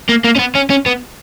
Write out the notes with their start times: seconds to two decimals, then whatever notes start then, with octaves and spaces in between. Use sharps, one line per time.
0.09 A#3
0.24 A#3
0.36 C#4
0.39 B3
0.55 C#4
0.70 C#4
0.86 B3